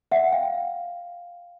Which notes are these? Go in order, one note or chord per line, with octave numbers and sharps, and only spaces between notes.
E5 F#5
F5 G5